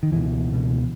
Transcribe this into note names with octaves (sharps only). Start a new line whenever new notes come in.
D#3
C#2 B2 E3
C#2 B2